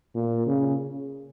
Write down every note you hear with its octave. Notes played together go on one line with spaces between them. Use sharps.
A#2
C#3